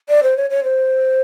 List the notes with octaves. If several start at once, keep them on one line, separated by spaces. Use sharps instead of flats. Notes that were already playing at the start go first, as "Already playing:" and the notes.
D5
C5
C#5
C#5
C5